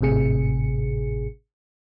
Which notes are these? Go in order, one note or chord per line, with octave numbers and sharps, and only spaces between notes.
G#1 A2 C3 G#4 C#7